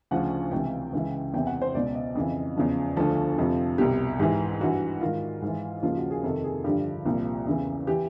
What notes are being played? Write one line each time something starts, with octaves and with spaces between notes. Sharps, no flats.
D2 C#3 F3 F#5
C#2 C3 E3 G5
C#2 C#3 E3
E2 C3 E3 G5
F#5
C5
C#2 B2 D5
D#5
F2 C#3 E3
E2 C#3 F3
D2 D3 F3 A4
F2 C3 F3
C2 B2 G4
G#2 E3 G4
G2 E3 F#4
G#2 D#3 F4
G#2 E3
D#2 C#3 F3 F4
F#4
G#4
F2 C3 D#3 A4
G#4
G2 D3 F3 G4
C2 A#2 F3
E2 C#3 E3
E3 G4